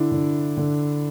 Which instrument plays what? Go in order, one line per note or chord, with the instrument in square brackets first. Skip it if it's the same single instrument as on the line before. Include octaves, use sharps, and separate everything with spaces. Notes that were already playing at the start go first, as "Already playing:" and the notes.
Already playing: [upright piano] D3 D4 E4
D3
D3